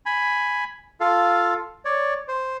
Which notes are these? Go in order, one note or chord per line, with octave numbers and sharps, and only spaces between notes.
G#5 B5
F4 A4 F5
C#5 D5
C5